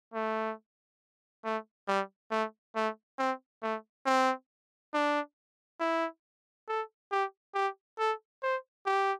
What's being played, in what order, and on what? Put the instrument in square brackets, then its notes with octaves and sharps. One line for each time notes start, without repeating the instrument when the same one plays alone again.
[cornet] A3
A3
G3
A3
A3
C4
A3
C4
D4
E4
A4
G4
G4
A4
C5
G4